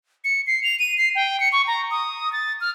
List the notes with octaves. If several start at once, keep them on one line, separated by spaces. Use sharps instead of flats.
C#7
C7
F7
D#7
C7
G5
C#7
C#6
A#5
D#6
A6
F6